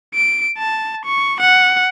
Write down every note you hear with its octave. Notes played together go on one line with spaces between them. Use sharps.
D7
A5
C#6
F#5